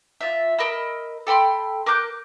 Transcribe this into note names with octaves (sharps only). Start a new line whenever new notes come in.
F4 E5
A#4 D#5 B5 E6
A4 G5 B5 C6
A#4 D6 F#6 G6